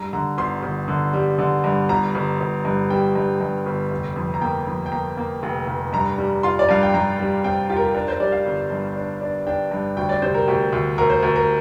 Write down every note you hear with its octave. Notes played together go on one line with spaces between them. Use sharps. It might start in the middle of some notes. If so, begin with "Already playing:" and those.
Already playing: G2 A#5
D3 A#5
G1 C6
G1
D3
G3
D3
G2
G1 A#5
G1
G1
G2
G3 G5
G2
G2
G1
F1
F2
A#5
A#3 G5
F2
G5
A#3 A#5
A#3
F1
F1
G2 A#5
G3
F4 C6
D5
G2 F5
G5
G2 A#5
G3
C4 G5
F4 G4
A#4
G4
D4 A#4
C5
G3 D5
F5
G1
G2
D4
D4
D4 G5
G2
D2 G5
D5
C3 C5
A#4
D2 G4
D2
D2 A#4
C5
D2 A#4
A#4